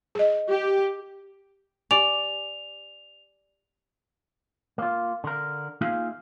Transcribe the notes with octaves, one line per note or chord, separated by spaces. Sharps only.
G#4 D#5
G4
G4 D5 G#5 F7
A#3 F4
D3 A#4
A#3 D#4 F4 G#4 E5 F5